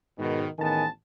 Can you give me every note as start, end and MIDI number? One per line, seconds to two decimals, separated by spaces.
0.19 0.48 44
0.19 0.48 47
0.19 0.48 51
0.58 0.86 33
0.58 0.86 51
0.58 0.86 59
0.58 0.86 68
0.58 0.86 80
0.58 0.86 81